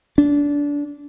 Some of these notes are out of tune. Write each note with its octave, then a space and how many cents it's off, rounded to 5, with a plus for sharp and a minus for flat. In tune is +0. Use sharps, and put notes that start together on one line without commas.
D4 -20